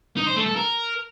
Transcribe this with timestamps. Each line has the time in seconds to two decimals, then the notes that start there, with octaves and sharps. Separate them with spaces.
0.17 D#4
0.26 C5
0.36 A3
0.46 A4
0.56 A#4